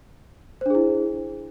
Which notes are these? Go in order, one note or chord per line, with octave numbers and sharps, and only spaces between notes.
D4 E4 G#4 C5